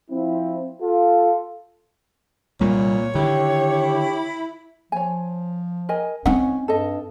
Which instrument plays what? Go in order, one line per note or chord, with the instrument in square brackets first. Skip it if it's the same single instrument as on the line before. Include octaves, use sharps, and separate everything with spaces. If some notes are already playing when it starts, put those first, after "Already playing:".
[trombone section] F3 C4 E4
F4 A4
[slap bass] C2 G3 A#3 [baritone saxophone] A#2 [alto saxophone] C#5
[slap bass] D3 D#3 [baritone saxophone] E4 [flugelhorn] G4
[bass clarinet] F3 [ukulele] C#5 G#5
[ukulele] A#4 D#5 G#5
[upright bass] C4 D#4 [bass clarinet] C#4 [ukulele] F#5
[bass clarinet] G2 [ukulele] A4 D#5